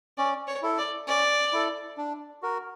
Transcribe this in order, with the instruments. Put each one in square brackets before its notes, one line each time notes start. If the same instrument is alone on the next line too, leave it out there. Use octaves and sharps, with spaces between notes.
[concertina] C#4 [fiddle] D5
[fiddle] C#5
[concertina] E4 A4
[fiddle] D5
[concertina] C#4 [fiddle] D5
[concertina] E4 A4
D4
F#4 A#4